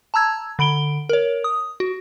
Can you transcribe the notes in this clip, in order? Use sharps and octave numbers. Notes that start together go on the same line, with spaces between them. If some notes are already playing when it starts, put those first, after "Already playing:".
A5 A#5 E6 G#6
D3 B5 D7 G7
A#4 C#5
D#6
F#4